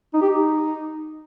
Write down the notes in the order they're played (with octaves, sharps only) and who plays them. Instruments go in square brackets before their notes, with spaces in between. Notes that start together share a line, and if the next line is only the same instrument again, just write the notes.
[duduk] D#4
G4
D#4